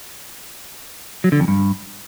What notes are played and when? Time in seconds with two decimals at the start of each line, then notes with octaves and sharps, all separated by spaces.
1.24 F#3
1.32 D3
1.40 F2
1.48 G2